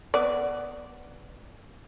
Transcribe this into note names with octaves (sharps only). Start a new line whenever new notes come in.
B3 D5